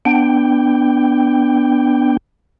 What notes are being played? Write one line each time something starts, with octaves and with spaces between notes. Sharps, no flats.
B3 D4 G5